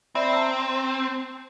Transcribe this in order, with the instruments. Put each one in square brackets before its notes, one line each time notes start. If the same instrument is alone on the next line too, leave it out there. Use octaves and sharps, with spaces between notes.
[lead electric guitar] C4 [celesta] D5 E5 B5
[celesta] A5 A#5 E6